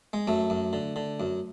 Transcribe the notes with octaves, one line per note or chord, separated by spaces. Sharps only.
G#3
F#2 A3
F#2
D3
D3
F#2